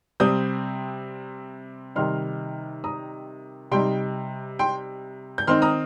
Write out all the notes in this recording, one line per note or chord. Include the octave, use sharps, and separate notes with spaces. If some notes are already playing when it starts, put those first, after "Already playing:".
C3 G3 C4 D#6 G6
C3 D#3 G3 D#4 C6 F6
A#5 D#6
C3 G3 D#4 G5 C6
G5 C6
G6
D#3 C4 D#4 C6 F6
A#5 D#6